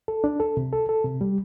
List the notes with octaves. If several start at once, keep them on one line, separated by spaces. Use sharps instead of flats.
A4
D4
A4
C3
A4
A4
C3
G3